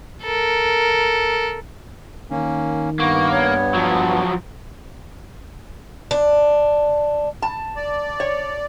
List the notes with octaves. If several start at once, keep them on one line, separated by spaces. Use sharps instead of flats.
A4 A#4
D#3 A#3 C#4
G2 A#3 B3 C#6
C#5
F3 F#3
D4
A5
D5
C#5